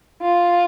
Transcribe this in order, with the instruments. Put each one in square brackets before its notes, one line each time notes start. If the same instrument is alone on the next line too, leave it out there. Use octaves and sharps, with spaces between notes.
[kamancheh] F4